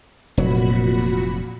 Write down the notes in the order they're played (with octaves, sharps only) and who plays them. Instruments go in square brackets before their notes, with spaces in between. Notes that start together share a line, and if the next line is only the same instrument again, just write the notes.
[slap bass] F1 F#3 [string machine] A#2 F#4 B5